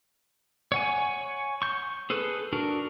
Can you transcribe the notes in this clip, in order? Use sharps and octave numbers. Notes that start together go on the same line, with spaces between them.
C#5 F#5 G#5
C#6 G6
G#4 A4 B4
D4 F#4 A#4